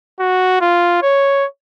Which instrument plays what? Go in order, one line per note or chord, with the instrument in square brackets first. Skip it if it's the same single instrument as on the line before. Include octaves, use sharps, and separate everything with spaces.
[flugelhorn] F#4
F4
C#5